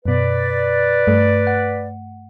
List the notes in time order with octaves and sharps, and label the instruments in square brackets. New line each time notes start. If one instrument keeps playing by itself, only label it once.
[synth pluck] F#2 B2 [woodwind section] B4 D5
[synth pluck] G2 A3
F#5